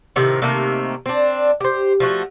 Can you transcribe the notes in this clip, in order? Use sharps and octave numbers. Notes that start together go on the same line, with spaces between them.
A2 C3 D#3 F4
C3 D#3 A3 A#3
C4 D4
G4 C5
F3 A3 F#4